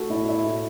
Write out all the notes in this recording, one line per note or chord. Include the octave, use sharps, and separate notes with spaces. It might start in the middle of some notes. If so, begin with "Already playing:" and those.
Already playing: A3 F#4 A4
A2 E4
E4
A2